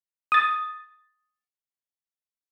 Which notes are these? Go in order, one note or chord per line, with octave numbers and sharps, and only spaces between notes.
D#6 A6